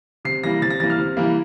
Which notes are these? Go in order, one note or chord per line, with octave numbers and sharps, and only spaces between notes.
C3 C7
E3 G3 A#3 A#6
C3 A6
A#6
E3 G3 A#3 A6
F6
C3
E3 G3 A#3